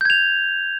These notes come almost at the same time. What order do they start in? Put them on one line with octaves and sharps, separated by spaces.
G6 G#6 F7